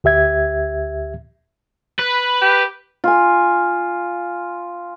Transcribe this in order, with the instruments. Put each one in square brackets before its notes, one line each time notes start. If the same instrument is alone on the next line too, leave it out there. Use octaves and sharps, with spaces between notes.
[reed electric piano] D2 G4 E5 G#6
[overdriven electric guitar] B4
[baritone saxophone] G4
[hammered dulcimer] F4 G#5